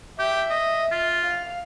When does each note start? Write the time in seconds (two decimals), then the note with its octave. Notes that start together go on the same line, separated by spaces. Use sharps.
0.19 G4 E5
0.50 D#5
0.91 F4
1.24 F5